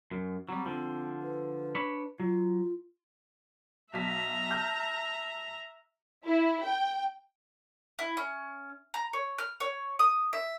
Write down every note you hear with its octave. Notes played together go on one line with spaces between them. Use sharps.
F#2
F#3 G3 C4
D3 F3 C4
B4
D4 C#5 B5
F#3 F4
B1 E5 A#5 B6
A5 F6 G6
E4
G5
E4
C#4
A#5
C#5
F6
C#5
D#6
E5